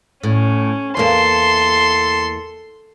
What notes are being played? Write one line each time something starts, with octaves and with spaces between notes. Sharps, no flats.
A2 C#4
E2 A#3 A4 C6